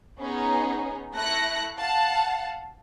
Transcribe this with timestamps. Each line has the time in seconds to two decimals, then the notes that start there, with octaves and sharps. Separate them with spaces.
0.19 B3 C#4 D#4 G#4
1.14 A3 E4 F#6 A#6 C#7
1.76 F5 F#5 A5